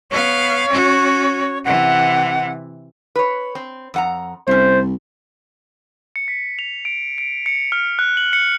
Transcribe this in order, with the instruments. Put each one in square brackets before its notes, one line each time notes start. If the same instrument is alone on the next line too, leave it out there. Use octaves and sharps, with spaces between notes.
[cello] B3 F5 [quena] C#5
[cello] C#4 F#4
[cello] C3 E3 [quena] F#5
[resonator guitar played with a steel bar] B4 C#5
C4
F2 F#5 A#5
[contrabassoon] C2 [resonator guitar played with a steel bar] A3 C#4 [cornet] C5
[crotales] C#7
B6
F7
D7
D7
C#7
F6
F#6
F#7
C#7